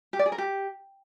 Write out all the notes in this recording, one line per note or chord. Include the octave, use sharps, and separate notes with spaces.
G4
D5
G#4
A#4
G4